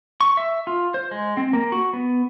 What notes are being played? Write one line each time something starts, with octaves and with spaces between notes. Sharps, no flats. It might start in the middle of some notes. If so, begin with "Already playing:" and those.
C#6
E5
F4
C5
G#3
C4
A#3
F#4
B3